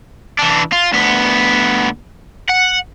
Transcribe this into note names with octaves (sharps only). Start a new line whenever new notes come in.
E3 D4
F4
D2 B3
F#5